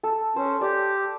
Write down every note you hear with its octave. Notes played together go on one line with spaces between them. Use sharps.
A4
C#4 C5
G4 D5